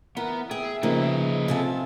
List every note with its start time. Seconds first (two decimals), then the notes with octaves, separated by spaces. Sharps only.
0.17 E3 B3 A#4
0.51 G#4 E5 G5
0.83 C#3 F3 A#3 D#4 G#4 B4 D#5
1.48 C3 F4 A4 G#5 A5